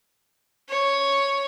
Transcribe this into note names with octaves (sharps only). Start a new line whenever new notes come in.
C#5